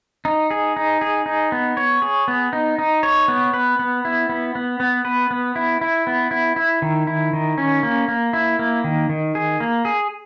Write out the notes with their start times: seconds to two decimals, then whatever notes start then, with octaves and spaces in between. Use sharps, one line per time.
0.25 D#4
0.51 G#4
0.76 D#4
1.01 G#4
1.26 D#4
1.52 B3
1.77 C#5
2.02 G#4
2.28 B3
2.53 D#4
2.79 D#4
3.03 C#5
3.28 B3
3.54 B4
3.79 B3
4.05 E4
4.29 B3
4.55 B3
4.80 B3
5.05 B4
5.31 B3
5.56 E4
5.81 E4
6.07 B3
6.31 E4
6.56 E4
6.82 D#3
7.07 E4
7.33 D#3
7.58 C#4
7.83 A#3
8.08 A#3
8.33 E4
8.59 A#3
8.84 D#3
9.10 D#3
9.35 G#4
9.60 A#3
9.85 G#4